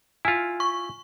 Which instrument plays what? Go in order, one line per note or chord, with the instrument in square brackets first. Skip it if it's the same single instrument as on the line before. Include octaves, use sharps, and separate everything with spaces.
[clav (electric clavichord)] E4 F4 [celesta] G#5 F6
[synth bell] C#6